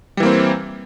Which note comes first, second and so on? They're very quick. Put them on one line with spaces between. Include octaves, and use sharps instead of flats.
G3 E3 A#3 C4